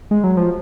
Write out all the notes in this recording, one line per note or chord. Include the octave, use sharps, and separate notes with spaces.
G#3
F#3
F3